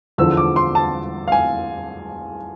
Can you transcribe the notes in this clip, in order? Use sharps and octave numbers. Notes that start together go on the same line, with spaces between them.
E2 D3 F3 E6
D6
C6
A5
F5
G#5